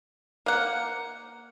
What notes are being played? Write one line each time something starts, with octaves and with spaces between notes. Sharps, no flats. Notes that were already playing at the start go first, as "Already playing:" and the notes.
A#3 F#5